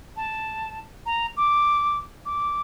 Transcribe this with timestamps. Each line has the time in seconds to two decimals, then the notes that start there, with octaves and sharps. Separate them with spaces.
0.17 A5
1.06 A#5
1.37 D6
2.26 D6